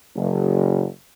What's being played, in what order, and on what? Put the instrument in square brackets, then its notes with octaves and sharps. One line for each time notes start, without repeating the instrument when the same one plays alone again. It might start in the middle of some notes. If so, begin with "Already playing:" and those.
[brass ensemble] F#1